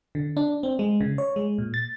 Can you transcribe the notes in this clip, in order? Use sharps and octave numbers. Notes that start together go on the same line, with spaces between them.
D3
D4
C4
G#3
C#3
C#5
G#3
A#2
A6